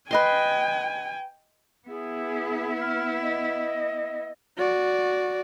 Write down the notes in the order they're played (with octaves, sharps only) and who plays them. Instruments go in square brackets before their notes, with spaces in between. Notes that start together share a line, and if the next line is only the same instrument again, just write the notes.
[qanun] B4 D#5 C6 [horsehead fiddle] G5 G#5
[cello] B3 E4 [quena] G#4
[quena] F6
D#5
[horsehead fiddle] F#4 D5